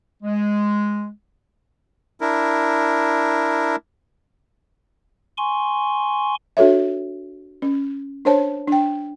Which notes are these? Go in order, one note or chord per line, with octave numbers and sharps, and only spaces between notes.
G#3
D4 E4 A#4
G#5 C6 C#6
D4 F#4 A4 C#5 E5
C#4
D4 A#4 C5 C#5 A5
D4 G5